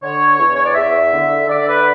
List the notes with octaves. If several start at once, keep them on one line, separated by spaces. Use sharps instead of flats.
D3 C#5
E2
C#5
D5
E2 E5
D3
D3 D5
B4